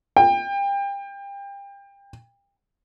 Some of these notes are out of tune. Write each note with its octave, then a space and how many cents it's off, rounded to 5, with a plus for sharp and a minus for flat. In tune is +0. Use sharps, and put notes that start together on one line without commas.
G5 +30